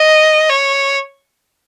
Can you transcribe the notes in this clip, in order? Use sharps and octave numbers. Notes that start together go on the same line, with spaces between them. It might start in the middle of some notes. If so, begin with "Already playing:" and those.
Already playing: D#5
C#5